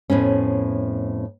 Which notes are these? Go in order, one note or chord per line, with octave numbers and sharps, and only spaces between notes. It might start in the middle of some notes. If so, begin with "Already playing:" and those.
F2 A2 B3 C#4